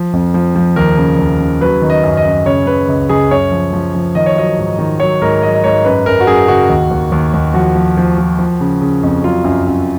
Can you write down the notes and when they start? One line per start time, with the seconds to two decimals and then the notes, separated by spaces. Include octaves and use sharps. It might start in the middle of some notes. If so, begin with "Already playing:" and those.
Already playing: F3
0.13 F2
0.34 F3
0.55 F3
0.76 D#2 A#4
0.97 C#3
1.19 D#2
1.40 C#3
1.61 F#3 B4
1.82 D#3
1.90 D#5
2.04 F#2
2.17 D#5
2.25 F#2
2.46 C#3 C#5
2.67 C#3 B4
2.89 C#2
3.09 C#2 G#4
3.31 F#2 C#5
3.51 F3
3.73 F3
3.95 F3
4.15 D#3 D#5
4.26 C#5
4.36 F#3 D#5
4.58 G#2
4.79 D#3
5.00 F#3 C#5
5.22 G#2 A#4
5.43 F#3 D#5
5.54 D#5
5.64 G#2 C#5
5.85 F#2 B4
6.06 F#2 A#4
6.20 F#4
6.27 F#2 G#4
6.48 C#3 F#4
6.69 D#2
6.91 D#2
7.12 D#2
7.34 D#2
7.54 F3 F#4
7.76 F3
7.97 F3
8.18 F3
8.39 F3
8.61 C#3
8.81 C#3
9.03 F2
9.24 F#3 F4
9.44 F#2
9.67 F#2